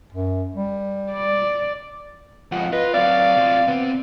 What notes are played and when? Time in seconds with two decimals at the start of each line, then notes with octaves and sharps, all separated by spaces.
0.13 F#2
0.55 G3
1.12 D5
2.52 F2 G#2 F4 F#5
2.72 F4 B4 D#5
2.94 F#3 C4 D5 F5
3.37 C3 F4
3.68 C3 B3 C4